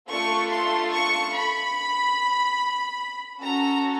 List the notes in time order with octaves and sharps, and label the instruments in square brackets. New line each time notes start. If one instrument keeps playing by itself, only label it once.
[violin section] A3 D4 F4 A4 C#6
C6
C#6
B5
C#4 F#4 A4 A#5